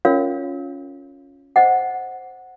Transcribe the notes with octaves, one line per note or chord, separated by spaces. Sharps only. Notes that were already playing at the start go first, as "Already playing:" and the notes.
C#4 F4 A#4 C#5 F5
C5 D#5 F#5